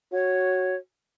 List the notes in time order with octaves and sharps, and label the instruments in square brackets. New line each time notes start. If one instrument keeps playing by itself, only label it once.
[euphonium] F#4 [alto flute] C#5